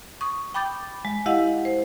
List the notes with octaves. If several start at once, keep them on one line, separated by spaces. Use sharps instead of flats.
C#6 D#6
G5 B5 D6 G6 A6
G#3
G#3 E4 G4 D#5 F5 F#5
C5